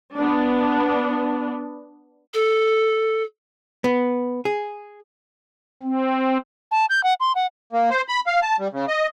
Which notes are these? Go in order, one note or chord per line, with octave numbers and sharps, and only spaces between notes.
B3 D4
A4
B3
G#4
C4
A5
G6
F#5
C6
F#5
A#3
C5
B5
F5
A5
G3
C#3
D#5